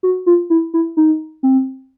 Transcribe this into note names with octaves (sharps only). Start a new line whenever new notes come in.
F#4
F4
E4
E4
D#4
C4